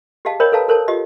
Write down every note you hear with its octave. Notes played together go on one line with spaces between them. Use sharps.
G4 G#4 D#5 F5 A5
A#4 C5 C#5 D#5 G5 B5
A4 B4 F5 A5 A#5
A4 A#4 C5 C#5 A5
F4 G4 D#5